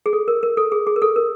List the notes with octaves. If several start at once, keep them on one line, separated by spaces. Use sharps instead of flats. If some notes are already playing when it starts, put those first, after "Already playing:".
G#4
A4
A#4
A#4
A4
G#4
G#4
A#4
A4
A#4